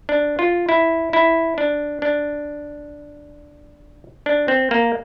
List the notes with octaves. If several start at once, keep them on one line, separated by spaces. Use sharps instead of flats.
D4
F4
E4
E4
D4
D4
D4
C4
A#3